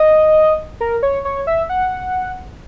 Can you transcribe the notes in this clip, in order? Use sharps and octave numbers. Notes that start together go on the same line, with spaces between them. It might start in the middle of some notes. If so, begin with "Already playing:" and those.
Already playing: D#5
A#4
C#5
C#5
E5
F#5